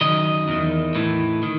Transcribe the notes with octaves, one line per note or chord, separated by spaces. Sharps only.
F#2 D#3 D#5
E2 D#3
A2 E3
D#3